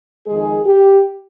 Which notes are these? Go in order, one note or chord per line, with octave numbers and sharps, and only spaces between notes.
F2 D#3 G#3 G#4
G4